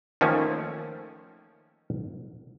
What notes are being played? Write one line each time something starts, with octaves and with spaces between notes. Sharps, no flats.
D#3 F3 A3 A#3 C#4